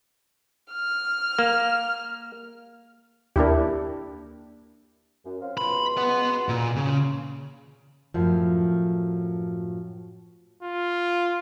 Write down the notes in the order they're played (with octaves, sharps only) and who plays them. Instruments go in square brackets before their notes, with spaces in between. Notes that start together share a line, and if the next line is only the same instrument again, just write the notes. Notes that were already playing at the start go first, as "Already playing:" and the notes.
[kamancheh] F6
[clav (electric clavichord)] A#3
[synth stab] D#2 A#3 [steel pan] D4 E4 G4
[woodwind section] F#2
C4 C#5 F5
[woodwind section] C#2 B2 C6 [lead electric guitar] B5
[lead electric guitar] B4 F#5
A#2
C#3
[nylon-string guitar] F#2 A2 F3
[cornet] F4